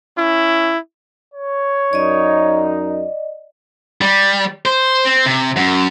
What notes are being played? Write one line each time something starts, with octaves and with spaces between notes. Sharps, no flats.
C#4 E4
C#5
F#2 D#4 D5 D#5
G3
C5
C4
C3
F#2